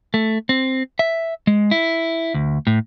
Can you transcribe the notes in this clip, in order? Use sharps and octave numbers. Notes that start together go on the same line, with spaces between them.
A3
C4
E5
G#3
E4
D2
A2